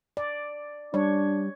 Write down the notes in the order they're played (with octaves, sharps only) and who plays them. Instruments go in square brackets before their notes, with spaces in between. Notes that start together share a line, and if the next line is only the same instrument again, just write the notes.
[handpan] D5
[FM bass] G3 [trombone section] D4 [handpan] C#5